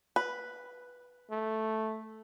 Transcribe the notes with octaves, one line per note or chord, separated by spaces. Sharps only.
B4
A3